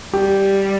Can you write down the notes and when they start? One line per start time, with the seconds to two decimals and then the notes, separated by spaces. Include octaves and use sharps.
0.13 G3 G4